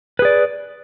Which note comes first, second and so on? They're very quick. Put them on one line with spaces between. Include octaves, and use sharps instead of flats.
B4 G#4 D5